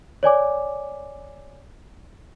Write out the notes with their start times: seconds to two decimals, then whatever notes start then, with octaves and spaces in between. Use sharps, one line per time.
0.23 C#5 D5 G#5 D6